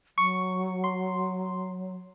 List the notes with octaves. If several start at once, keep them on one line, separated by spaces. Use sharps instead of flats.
F#3 C#6
C6